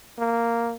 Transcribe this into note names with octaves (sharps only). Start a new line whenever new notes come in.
A#3